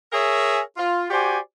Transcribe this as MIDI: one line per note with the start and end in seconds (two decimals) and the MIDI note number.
0.12 0.59 68
0.12 0.59 70
0.12 0.59 73
0.12 0.59 76
0.12 0.59 80
0.77 1.05 65
1.10 1.38 66
1.10 1.38 67
1.10 1.38 72
1.10 1.38 74
1.10 1.38 80